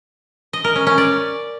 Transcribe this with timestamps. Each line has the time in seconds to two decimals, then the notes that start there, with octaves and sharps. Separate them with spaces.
0.53 D#5
0.64 A#4
0.76 C#4
0.87 C#4
0.98 D5